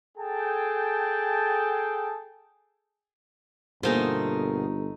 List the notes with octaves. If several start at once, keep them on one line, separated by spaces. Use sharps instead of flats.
G#4 A4 G5 A5
G1 B2 A3 A#3 D#4 G#4 C5